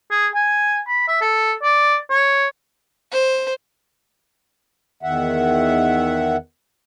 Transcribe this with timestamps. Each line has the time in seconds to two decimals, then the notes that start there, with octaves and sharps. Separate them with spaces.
0.11 G#4
0.35 G#5
0.88 B5
1.08 E5
1.21 A4
1.63 D5
2.10 C#5
3.13 C5
5.03 E2 D#3 E5 F#5